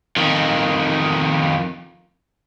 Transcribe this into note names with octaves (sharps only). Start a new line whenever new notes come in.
F2 D#3